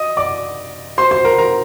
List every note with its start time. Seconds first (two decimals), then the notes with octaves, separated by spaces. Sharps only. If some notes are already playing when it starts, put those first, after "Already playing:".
Already playing: D#5 D#6
0.17 D5 D6
0.98 C5 C6
1.11 C5 C6
1.25 A#4 A#5
1.38 A#4 A#5